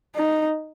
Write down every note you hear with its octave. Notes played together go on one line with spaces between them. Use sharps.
D#4